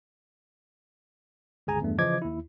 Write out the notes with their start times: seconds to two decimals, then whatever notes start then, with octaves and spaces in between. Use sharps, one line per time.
1.67 G1 C#2 G#4 G#5 A#5
1.81 E2 G2 A3
1.98 C#3 E3 F3 D#5 D6 G#6
2.22 D#2 E4